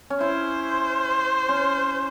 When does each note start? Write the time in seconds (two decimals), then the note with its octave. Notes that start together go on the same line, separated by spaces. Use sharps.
0.10 C#4
0.20 E4 C5
1.49 C#4